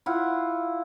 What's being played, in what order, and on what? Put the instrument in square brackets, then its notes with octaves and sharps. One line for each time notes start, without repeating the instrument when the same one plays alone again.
[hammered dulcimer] E4 F4 F#5